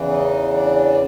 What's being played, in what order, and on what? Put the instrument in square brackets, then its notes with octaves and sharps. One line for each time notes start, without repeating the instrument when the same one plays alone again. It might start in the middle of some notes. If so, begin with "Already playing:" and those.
Already playing: [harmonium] E2 C#3 E3
D#4
D4